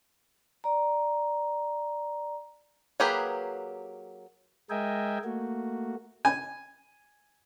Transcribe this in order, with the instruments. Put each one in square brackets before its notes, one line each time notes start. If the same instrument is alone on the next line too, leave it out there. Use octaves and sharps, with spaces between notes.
[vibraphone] D5 A#5
[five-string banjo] F#3 A#3 G4 G#4 B4
[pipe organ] G#3 A#4 D#5 E5 G5 G#5
A3 A#3 F#4
[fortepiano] G#5